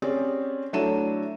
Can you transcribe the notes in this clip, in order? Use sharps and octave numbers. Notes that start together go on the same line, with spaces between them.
C4 C#4 G4 G#4 D5
F#3 A3 D4 E4 D#7 E7